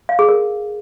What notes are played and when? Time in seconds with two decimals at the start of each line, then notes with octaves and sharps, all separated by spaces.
0.09 F5
0.19 G#4
0.29 A#4